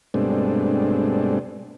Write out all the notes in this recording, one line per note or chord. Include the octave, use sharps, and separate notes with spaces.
G2 B2 G#3 A3 C4 D4